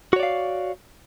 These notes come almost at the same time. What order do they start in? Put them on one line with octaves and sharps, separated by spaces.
F#4 C#5 D5 F5